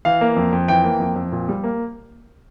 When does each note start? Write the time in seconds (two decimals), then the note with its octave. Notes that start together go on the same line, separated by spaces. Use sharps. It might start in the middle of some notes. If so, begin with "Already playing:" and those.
0.05 E3 F5
0.21 A#3
0.36 F2
0.52 F2
0.68 E3 G5
0.84 A#3
1.00 F2
1.16 F2
1.32 A#2
1.49 G3
1.64 A#3